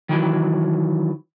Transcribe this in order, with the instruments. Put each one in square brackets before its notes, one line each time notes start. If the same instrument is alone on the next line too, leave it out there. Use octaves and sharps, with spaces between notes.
[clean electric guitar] D#3 E3 F#3